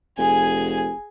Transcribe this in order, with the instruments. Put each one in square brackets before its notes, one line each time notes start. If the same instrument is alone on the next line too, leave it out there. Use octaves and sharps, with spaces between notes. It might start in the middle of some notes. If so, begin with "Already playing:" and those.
[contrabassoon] F1 [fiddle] G#4 G#5